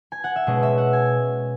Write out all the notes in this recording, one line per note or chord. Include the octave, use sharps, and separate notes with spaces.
G#5
F#5
E5
B2 G#3 C#4 D#5
E5
F#5
G#5